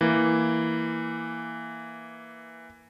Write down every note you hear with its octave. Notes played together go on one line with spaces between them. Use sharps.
E3 A#3